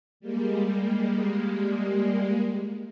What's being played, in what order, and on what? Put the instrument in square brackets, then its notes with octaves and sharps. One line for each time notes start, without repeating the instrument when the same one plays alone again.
[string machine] G3 G#3 A#3